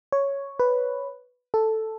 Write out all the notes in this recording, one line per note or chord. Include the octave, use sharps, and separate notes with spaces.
C#5
B4
A4